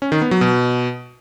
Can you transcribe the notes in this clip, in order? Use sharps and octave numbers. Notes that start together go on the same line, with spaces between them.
C#4
D#3
B3
F#3
B2